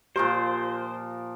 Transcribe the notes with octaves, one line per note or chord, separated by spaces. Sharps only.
A#2 F3 G4 A#4 C5 B5